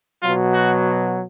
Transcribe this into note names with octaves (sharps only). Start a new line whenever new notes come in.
B2 F#3 F4
F#4